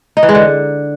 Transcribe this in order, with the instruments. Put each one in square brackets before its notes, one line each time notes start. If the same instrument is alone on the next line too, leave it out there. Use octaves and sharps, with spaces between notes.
[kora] D#4
E3
G#3
D3